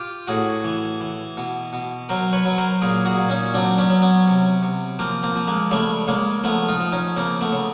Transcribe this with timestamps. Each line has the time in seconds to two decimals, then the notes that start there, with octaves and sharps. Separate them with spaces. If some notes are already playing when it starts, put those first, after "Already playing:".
Already playing: F4 G4
0.28 A2 F#4 G#4
0.64 E3
1.01 E3
1.37 B2
1.73 B2
2.09 F#3 A#4 C5
2.33 B4 C#5
2.45 F#3
2.58 A#4 C5
2.82 A#2 G#4 A#4
3.05 F#4 G#4
3.17 A#2
3.30 C#4 D#4
3.54 F#3 C4 D4
3.79 B3 C#4
3.90 F#3
4.02 B3 C#4
4.27 C3
4.63 C3
4.99 F3 A#3 C4
5.23 A#3 C4
5.36 F3
5.48 G#3 A#3
5.71 C#3 G3 A3
6.08 C#3 G#3 A#3
6.44 F3 A3 B3
6.68 D#4 F4
6.80 F3
6.92 C#4 D#4
7.16 C#3 A#3 C4
7.41 A3 B3
7.52 C#3